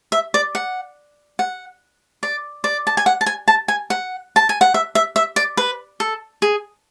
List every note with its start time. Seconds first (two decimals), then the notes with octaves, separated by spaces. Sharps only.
0.12 E5
0.34 D5
0.55 F#5
1.39 F#5
2.23 D5
2.64 D5
2.87 A5
2.97 G#5
3.06 F#5
3.21 A5
3.26 G#5
3.48 A5
3.68 G#5
3.90 F#5
4.36 A5
4.49 G#5
4.61 F#5
4.74 E5
4.95 E5
5.16 E5
5.36 D5
5.57 B4
6.00 A4
6.42 G#4